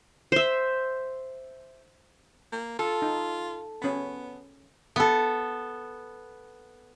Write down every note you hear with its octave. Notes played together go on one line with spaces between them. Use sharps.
C5 E5
A#3
F4 A4
D#4
B3 C#4 B5
B3 A4